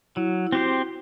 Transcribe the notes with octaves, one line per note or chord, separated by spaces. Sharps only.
F#3 E4
E4
C4 F#4 G4 C5